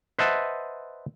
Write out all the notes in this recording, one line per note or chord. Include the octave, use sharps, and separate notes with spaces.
B4 C5 D#5 E5 F#5 A5